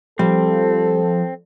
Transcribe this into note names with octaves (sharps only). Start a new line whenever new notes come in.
F3 G3 C4 A4